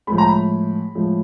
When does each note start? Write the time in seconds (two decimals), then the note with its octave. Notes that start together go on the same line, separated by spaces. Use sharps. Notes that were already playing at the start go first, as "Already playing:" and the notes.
0.07 A2 F3 G#3 B5
0.18 A#5
0.29 B5
0.95 A2 F3 G#3